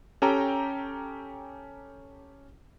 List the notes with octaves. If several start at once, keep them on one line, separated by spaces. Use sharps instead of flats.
C#4 G4 A4 G5 A#5